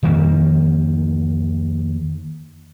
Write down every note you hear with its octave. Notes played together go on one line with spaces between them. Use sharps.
F2 D#3 G3 A#3